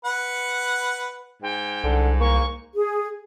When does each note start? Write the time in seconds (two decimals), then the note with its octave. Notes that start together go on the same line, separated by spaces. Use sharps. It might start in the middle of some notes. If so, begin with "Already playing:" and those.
0.05 B4 F#5
1.42 G#2 G5
1.84 C2 D3
2.20 A#3 C#6
2.75 G#4